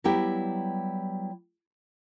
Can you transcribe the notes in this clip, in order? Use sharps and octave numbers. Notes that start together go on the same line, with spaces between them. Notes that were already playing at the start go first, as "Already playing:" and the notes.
F#3 G3 B3 E4 G4 G5